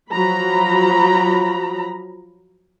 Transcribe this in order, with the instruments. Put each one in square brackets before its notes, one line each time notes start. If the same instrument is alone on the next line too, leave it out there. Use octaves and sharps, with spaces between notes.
[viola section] F3 F#3 A#5 B5